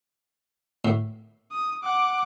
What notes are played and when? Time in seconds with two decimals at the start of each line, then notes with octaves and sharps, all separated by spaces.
0.85 A2
1.51 D#6
1.83 F#5 D6